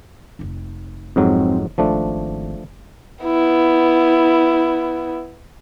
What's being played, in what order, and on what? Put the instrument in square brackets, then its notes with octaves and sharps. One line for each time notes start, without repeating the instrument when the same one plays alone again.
[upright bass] F1 D#4
[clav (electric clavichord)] F2 G#2 F#3 [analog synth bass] C4
[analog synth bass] G#1 [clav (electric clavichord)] F3 A3 D4
[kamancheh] B3 E4